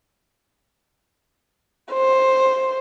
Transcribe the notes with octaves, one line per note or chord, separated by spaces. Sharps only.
C5